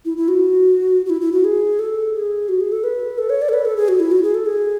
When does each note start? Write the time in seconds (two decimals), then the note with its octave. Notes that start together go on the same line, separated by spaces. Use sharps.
0.05 E4
0.17 E4
0.28 F#4
1.06 F#4
1.10 E4
1.21 E4
1.32 F#4
1.44 G#4
1.79 A4
2.14 G#4
2.49 F#4
2.61 G#4
2.72 A4
2.84 B4
3.18 A4
3.30 C#5
3.42 D5
3.49 A4
3.53 B4
3.65 A4
3.77 G#4
3.88 F#4
4.00 E4
4.11 F#4
4.23 G#4
4.35 A4
4.46 G#4